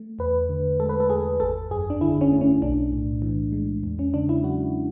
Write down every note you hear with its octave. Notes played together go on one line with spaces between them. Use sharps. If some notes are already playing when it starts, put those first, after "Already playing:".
Already playing: A3
E2 B4
D3
G#3 A4
B4
A4
E2 G#4
G#1 A4
F#2 G#4
D4
D3 E4
C#4
A3
C#4
B1 D4
A2
E3
G#3
E2
C#4
C#3 D4
E4
F#3 F#4